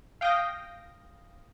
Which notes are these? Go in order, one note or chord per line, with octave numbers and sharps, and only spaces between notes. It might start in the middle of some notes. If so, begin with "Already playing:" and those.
F5 G5 D#6 G6 A#6